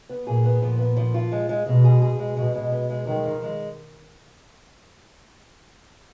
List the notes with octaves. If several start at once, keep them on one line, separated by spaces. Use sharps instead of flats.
B3
A#2 G#4
B3
A#2 F3
B3
F3
F4
G#3
G#3
B2 G#3
G#4
G#4
G#3
B2 G#3
G#3
B3
G#3
D#3 G#3
F3
G#3